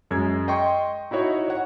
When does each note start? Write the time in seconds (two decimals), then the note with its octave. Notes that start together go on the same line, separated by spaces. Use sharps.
0.11 F#2 G#3 G#6
0.48 D#5 G5 C6 C#6
1.11 D#4 E4 F#4 C#5 D#5
1.48 C#5 F#5